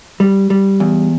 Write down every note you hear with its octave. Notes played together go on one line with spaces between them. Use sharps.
G3
G3
E2